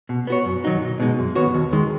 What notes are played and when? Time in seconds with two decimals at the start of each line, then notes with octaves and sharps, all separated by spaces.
0.09 B2
0.27 B3 F#4 C#5
0.45 F#2
0.64 D#3 F#3 D#4 F#4
0.82 B1
1.00 B2 G#3 D#4
1.19 F#2
1.35 D#3 B3 F#4 C#5
1.54 D#2
1.73 D#3 G#3